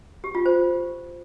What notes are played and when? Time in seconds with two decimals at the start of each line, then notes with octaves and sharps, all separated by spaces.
0.24 G4
0.35 F4
0.46 C5